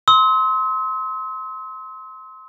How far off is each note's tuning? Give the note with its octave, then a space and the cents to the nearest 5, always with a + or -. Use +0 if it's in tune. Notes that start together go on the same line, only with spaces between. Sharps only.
C6 +0 E6 -45